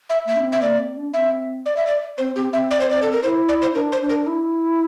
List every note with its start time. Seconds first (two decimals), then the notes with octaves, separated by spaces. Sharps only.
0.09 E5
0.26 A#3 E5
0.36 D4
0.40 C4
0.52 E5
0.62 A#3 D5
0.79 C4
0.97 D4
1.13 C4 E5
1.66 D5
1.76 E5
1.87 D5
2.18 C4 C5
2.36 C4 G4
2.53 C4 E5
2.71 D5
2.81 C5
2.90 D5
3.02 A4
3.12 A#4
3.22 E4 C5
3.48 D5
3.62 C5
3.74 D4 A#4
3.92 C5
4.01 D4
4.09 A#4
4.27 E4